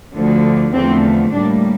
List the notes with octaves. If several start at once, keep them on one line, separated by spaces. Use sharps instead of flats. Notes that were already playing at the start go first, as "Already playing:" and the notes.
D2 D3 F3
E2 D3 F3 A3 C4
A2 G3 A#3 D4